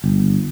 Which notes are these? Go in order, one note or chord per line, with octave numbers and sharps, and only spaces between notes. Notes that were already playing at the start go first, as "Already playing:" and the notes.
G1